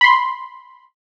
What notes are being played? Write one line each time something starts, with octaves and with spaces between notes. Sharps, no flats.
B5 C6